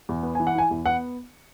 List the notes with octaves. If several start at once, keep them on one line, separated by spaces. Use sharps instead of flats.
E2
B3
E3 G#5
F#5
E4 G#5
E2
B3 F#5